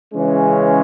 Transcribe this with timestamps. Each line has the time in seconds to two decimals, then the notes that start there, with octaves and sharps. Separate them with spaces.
0.14 C#3 E3 G#3 C#4